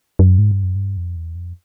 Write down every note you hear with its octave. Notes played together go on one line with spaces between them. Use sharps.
F#2
G#2
G2
F#2
G2
F2
E2
F2